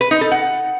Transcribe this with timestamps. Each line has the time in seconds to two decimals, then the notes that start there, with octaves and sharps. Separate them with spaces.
0.01 B4
0.11 D#4
0.21 A4
0.31 F#5